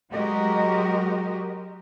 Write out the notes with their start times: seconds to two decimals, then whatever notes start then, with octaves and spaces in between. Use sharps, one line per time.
0.11 F#3 G#3 F#4 G4 A#4 D#5